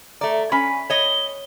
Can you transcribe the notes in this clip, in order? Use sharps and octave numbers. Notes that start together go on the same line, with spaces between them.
A3 D5 A#5
C#4 G#5 B5
C#5 D#5 G7